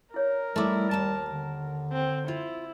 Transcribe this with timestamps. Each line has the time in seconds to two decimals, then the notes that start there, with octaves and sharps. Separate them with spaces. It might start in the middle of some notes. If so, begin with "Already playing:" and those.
0.14 E4 A#4 C#5 D5
0.56 G3 A3 D#4 E4 C6 D6
0.91 D#2 A5
1.30 D3
1.92 C4
2.28 E4 F4